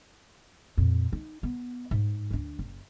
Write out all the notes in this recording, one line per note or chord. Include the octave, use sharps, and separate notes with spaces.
F2 A#2
D#4
B3
G#2
D2 D4
F#1